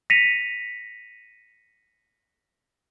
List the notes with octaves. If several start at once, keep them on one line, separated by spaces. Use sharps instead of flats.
A#6 B6 C#7 D#7 F7